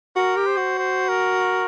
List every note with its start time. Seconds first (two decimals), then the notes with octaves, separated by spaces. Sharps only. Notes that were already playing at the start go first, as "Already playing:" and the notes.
0.16 F#4 A#4
0.36 G4
0.47 C5
0.57 F#4
0.78 C5
1.09 A#4